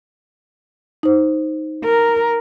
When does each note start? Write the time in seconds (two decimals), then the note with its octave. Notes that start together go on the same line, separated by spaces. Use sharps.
1.03 D#4 C5
1.84 A#4